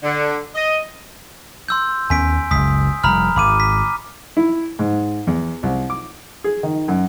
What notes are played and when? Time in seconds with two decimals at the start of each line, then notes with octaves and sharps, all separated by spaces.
0.03 D3
0.55 D#5
1.68 C6 E6 G6
2.10 D#2 B3 C#4 G#5 B6 D7
2.51 F#1 C#2 D#6 B6
3.04 F1 G3 A#5 B5 F6
3.36 G#1 B5 D6 D#7
3.60 B6
4.37 E4
4.79 G#2
5.27 E2
5.63 C2
5.90 D6
6.44 G#4
6.63 D#3
6.88 F#2